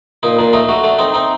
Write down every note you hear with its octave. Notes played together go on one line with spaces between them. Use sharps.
A#2 D#4
A#2 D4
A3 D#4
A3 F#4
A3 D4
C4 D#4
C4 D#4